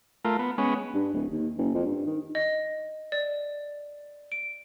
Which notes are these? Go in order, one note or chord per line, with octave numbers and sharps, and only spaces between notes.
A3 F4 A#4
B3
G#3 B3 C#4
G2
D1
D#2
F#1
F2
G2
D#3
D#5
D5
D7